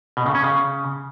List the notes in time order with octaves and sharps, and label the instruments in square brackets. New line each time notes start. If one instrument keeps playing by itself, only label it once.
[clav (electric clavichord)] B2
C#3
C#4
C#3